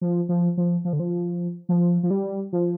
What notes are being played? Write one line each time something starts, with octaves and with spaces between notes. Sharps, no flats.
F3
F3
F3
F3
D3
F3
F3
F3
G3
F3